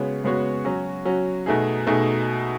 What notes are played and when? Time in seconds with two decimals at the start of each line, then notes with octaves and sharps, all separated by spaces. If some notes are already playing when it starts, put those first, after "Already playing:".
Already playing: C#3 G#3 B3 F#4 C#5
0.24 C#3 G#3 B3 F#4 C#5
0.65 F#3 C#4 F#4
1.05 F#3 C#4 F#4
1.46 B2 A3 D#4 G#4
1.87 B2 A3 D#4 G#4